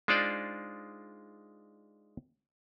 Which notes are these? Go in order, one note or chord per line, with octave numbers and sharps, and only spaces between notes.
G#3 D4 D#4 F4 C5 D5